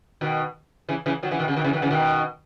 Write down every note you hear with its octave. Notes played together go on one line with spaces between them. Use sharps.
B2 D#3
C#3 E3
C#3 E3
D#3 F#3
C#3 E3
B2 D#3
C#3
B2 D#3
C#3 E3
D#3 F#3
C#3 E3
B2 D#3